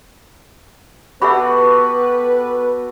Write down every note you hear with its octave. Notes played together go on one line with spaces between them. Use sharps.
B3 F#4 G4 A4 B4 E5 F#5 B5